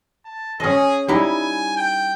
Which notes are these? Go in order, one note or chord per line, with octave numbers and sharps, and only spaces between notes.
A5
C#4 G#4 D#5
G3 D#4 E4 G#5
G5